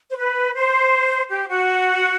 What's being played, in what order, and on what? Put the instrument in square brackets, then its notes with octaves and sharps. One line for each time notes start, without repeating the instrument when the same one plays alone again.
[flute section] C5
B4
C5
G4
F#4